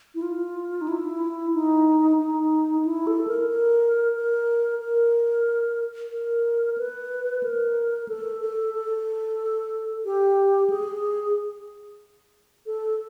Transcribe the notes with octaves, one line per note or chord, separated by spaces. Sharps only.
E4
F4
D#4
E4
D#4
D#4
E4
A4
A#4
A#4
A#4
A#4
A#4
B4
A#4
A4
A4
A4
G4
G#4
A4